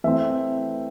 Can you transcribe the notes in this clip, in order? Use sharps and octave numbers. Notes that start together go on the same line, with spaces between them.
E3 A3 C4 E5